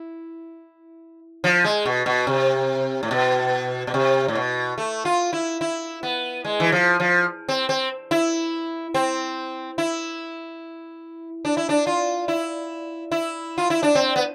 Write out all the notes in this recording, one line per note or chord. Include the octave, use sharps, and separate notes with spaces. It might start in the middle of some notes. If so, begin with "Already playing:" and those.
Already playing: E4
F3
G#3
B2
B2
C3
A2
B2
B2
C3
A2
B2
A3
F4
E4
E4
B3
G#3
E3
F3
F3
C4
C4
E4
C4
E4
D4
E4
D4
F4
E4
E4
F4
E4
D4
C4
B3